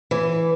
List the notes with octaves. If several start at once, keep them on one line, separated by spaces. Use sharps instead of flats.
E3